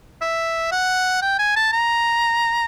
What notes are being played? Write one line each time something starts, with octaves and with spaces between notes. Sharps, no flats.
E5
F#5
G5
G#5
A5
A#5